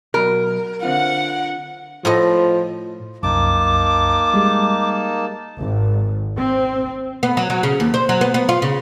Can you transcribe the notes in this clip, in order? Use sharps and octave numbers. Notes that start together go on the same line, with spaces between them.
B2 F#3 A#4
D3 C4 F4 F#5
A2 F3 A4 D#5
C2 F#2 A#3 D#4 A5 D6
G3 G#3
G#1
C4
B3
F#3
F#3
C#3
D#2
C5
F#3
B3
B3
F4
C#3